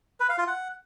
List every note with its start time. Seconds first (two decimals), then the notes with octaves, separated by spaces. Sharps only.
0.20 B4
0.29 F5
0.38 F4
0.47 F#5